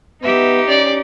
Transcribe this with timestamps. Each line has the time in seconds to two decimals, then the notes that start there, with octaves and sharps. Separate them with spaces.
0.23 B3 D#4 G4 E5
0.68 C#4 D5